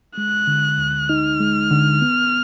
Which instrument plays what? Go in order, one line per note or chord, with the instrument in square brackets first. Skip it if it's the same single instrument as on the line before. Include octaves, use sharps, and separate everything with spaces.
[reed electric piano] G#3 [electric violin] F#6
[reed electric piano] D3
D2
[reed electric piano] D#4 [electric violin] F6
[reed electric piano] G#3
D3
B3